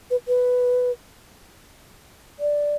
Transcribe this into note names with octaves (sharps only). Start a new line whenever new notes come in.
B4
B4
D5